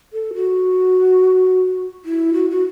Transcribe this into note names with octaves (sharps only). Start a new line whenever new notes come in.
A4
F#4
E4
F#4
F#4